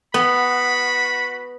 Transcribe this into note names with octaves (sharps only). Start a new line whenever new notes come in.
B3 F#4 B5